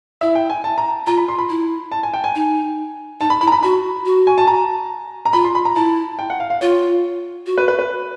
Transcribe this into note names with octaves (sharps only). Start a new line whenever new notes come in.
E4 E5
G5
G#5
A5
A#5
F4 A#5
B5
C6
B5
E4
A5
G#5
G5
G#5
D#4
D#4 A5
B5
E4 B5
A#5
B5
F#4 B5
F#4
G#5
A5
A#5
A#5
F4 B5
C6
B5
A#5
E4 A5
G5
F#5
F5
F5
F4 C#5
F#4
B4
B4
B4